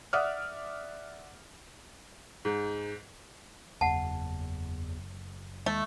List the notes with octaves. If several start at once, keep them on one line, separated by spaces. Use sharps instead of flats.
D5 E5 F#5 D6 D#6 F6
G#2
F#1 E2 F#5 A5
D#2 G#3 A3